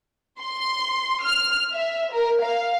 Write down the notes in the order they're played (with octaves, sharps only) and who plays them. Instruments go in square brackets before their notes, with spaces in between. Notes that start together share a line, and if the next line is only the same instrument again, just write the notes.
[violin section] C6
F6
E5
A#4
F5